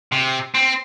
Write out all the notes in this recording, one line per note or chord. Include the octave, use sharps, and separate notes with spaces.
C3
C4